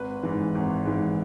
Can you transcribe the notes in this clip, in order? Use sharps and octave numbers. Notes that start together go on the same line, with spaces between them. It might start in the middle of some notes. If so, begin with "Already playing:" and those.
Already playing: G#1 B4
G#2 E3
G#1
G#2 E3